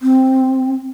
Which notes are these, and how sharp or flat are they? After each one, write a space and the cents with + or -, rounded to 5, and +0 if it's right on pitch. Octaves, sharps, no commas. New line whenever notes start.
C4 +5